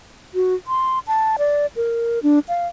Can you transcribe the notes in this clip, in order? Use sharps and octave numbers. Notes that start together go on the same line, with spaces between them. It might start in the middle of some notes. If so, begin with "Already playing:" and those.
F#4
C6
A5
D5
A#4
D4
F5